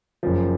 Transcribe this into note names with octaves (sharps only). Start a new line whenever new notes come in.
F#1 F#2 F3